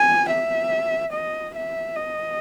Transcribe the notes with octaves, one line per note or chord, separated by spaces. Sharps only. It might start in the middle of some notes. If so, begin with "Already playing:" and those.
Already playing: G#5
E5
D#5
E5
D#5